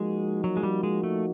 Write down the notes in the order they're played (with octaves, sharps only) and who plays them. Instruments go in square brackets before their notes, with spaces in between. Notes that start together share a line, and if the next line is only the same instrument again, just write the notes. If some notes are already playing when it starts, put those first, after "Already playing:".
Already playing: [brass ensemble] F3 A#3 D#4 F#4 [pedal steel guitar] G#3
[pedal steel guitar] F#3
G#3
G3
G#3
A3